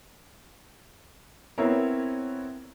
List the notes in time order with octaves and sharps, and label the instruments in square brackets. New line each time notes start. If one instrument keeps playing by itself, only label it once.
[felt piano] B3 C4 E4 A#4 C#5